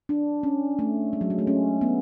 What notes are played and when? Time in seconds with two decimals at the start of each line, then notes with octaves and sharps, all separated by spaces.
0.09 D4
0.43 C#4
0.79 A3
1.13 G#3
1.21 F#3
1.30 G#3
1.39 A3
1.47 C#4
1.81 B3